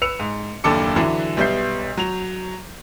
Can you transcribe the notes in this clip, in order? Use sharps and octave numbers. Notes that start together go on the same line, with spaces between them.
B4 E6 C#7 F7
G#2
F#1 D#2 D4 A4 D6 C#7
D3 E3 F#3 D4 E4
B1 G3 B3 E5 G6 C7
F#3 F7